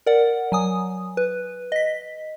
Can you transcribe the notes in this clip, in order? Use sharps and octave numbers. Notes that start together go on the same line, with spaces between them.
A#4 D5 F#5
F#3 G#5 D#6
B4
D#5 B6